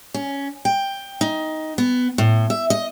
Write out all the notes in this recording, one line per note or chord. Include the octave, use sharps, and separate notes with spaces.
C#4
G5
D#4
B3
A2
E5
D#5